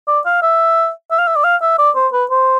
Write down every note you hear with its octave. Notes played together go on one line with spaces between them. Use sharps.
D5
F5
E5
E5
F5
E5
D5
F5
E5
D5
C5
B4
C5